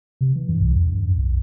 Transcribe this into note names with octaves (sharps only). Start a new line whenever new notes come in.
C3
E3
G2
C2
F2
G2
F#2
B1